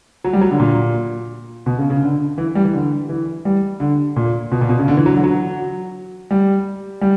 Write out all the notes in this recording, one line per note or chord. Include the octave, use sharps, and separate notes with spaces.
F#3
G3
F#3
D3
A#2
B2
C#3
C#3
D3
E3
G3
E3
D3
E3
G3
D3
A#2
B2
A#2
B2
C#3
D3
E3
F#3
D3
F#3
G3
G3